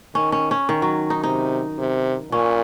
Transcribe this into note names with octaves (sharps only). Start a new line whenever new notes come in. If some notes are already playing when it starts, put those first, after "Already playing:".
D#3 C#4
C#4
C#4
D#3
F#3
D#4
C3 D#4
C3
A#2 C#4